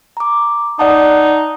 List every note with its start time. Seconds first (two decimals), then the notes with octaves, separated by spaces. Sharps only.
0.17 A#5 D6
0.79 D#4 D5 F#5 A5